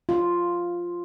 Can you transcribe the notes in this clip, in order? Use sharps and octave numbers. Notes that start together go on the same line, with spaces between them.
F4